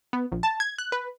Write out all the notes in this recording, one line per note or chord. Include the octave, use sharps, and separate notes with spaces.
B3
A#1
A5
G#6
F#6
B4